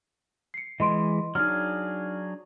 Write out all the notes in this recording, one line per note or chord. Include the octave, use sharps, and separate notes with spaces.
C7 C#7
E3 G#3 D#5 C6 D7
F#3 D4 D#4 G#4 F6